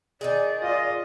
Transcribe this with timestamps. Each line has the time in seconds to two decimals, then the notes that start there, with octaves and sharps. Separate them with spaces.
0.21 D#3 D#4 G#4 D5
0.62 F4 D#5